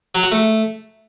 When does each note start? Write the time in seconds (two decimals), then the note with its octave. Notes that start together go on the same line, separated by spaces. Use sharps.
0.15 F#3
0.23 F#4
0.32 A3